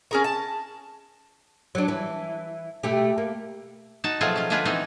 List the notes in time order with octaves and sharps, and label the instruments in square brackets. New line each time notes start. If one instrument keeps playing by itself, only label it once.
[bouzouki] C#4 G#4 A#4
A5
[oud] F#3 D4
E3
B2 A3 G4
A#3
[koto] D#4 F#4 A5
B2 F3 F#3 A3 F4 G#4
C#4 F4
D3 G#3 D4 F4 G#4 B4
E3 B3 C4 D#4 F#4